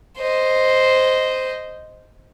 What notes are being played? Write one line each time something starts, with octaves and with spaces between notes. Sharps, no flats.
C5 D#5